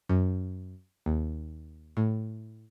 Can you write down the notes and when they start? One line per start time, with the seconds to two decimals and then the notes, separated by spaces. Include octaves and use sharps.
0.09 F#2
1.06 D#2
1.97 A2